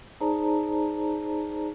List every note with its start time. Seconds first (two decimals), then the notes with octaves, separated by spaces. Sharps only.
0.20 D#4 G#4 C5 D5 A5 A#5